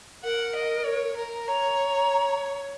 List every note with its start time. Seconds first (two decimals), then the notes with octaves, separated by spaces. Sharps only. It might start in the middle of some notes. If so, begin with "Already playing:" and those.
0.24 A#4 F#5
0.55 D#5
0.85 C#5
1.17 A#4
1.47 C#5 A#5